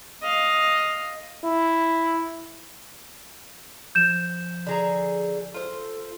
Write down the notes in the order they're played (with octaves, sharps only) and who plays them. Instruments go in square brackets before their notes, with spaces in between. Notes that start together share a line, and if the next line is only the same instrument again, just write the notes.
[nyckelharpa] D#5 F5
[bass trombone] E4
[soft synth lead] F3 [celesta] G6 E7
[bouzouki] D3 G#4 A#5
[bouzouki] F4 C5 [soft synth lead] A4